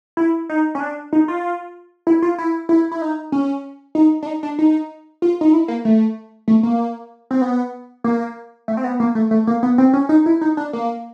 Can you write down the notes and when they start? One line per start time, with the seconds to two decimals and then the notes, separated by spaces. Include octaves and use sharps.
0.17 E4
0.49 D#4
0.75 C#4
0.80 D4
1.13 D#4
1.28 F4
2.07 E4
2.22 F4
2.38 E4
2.69 E4
2.92 E4
3.02 D#4
3.32 C#4
3.95 D#4
4.23 D4
4.26 D#4
4.43 D4
4.59 D#4
5.22 F4
5.41 D#4
5.53 E4
5.68 A#3
5.85 A3
6.48 A3
6.63 A#3
7.31 C4
7.41 B3
8.04 A#3
8.68 A3
8.77 C4
8.84 B3
9.00 A#3
9.15 A3
9.31 A3
9.47 A#3
9.63 B3
9.78 C4
9.93 C#4
10.09 D#4
10.26 E4
10.41 D#4
10.57 D4
10.73 A#3